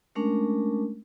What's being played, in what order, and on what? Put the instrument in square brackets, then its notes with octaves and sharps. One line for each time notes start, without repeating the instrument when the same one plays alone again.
[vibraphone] G#3 A3 C#4 D4 A#4